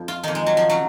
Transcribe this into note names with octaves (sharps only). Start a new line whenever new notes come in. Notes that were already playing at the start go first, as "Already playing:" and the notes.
Already playing: F2
F4
F2 D#3 D#4
G#3
F#3
F3
C#3 F#3